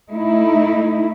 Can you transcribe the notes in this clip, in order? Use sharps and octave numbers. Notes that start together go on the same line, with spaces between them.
A3 D#4 E4